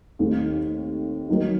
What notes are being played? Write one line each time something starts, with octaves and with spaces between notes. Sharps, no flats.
D#2 D#3 A3 C4
D#3 F#3 A#3